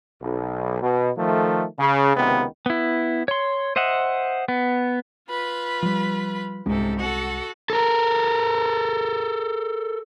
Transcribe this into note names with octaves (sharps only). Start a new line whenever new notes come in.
B1
B2
D#3 F3 A3
C#3
C#2 C3 D#3 B3
B3 E4
C#5 C6
C5 D#5 E5 F#5
B3
F4 B4 B5
F3 G3
C2 G#2 C3 G#3 C#4 A4
F#4 A4 F#5
A4 A#4